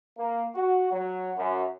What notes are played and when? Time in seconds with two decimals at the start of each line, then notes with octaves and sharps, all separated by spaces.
0.18 A#3
0.55 F#4
0.91 F#3
1.37 F#2